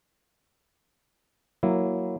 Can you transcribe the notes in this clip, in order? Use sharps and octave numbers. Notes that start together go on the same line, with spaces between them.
F#3 A#3 E4